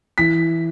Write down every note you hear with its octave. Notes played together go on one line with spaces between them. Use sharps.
E3 B6